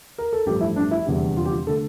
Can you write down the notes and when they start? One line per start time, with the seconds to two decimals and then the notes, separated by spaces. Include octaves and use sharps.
0.18 A#4
0.33 A4
0.46 A1 G2 F3 A3 G4
0.61 E4
0.76 D4
0.91 E4
1.06 F1 E2 D3 G3
1.37 F4
1.46 G4
1.51 F4
1.67 D3 A3 A4